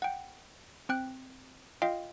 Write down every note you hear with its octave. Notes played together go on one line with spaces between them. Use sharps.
F#5 G5
C4 G5 F#6
F4 D#5 F5 G5